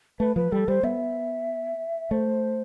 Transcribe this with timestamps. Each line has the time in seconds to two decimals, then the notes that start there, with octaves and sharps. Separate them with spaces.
0.20 A3 B4
0.36 F3 B4
0.52 G3 A4
0.68 G3 C5
0.83 B3 E5
2.11 A3 C5